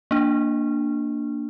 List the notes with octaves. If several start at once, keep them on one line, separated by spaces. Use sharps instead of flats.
A#3 D4